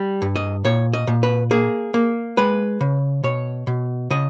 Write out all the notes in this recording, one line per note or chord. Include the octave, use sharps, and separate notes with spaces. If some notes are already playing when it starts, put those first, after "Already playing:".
Already playing: G3
G2
D#5
A#2 C#5
D#5
A#2
B4
A#3 G#4
A#3
G#3 B4
C#3
B2 C#5
B2
C#3 D#5